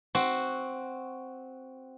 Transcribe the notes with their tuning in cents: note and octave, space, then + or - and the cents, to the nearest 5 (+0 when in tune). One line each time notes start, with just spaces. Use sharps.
C4 +0 F#4 +0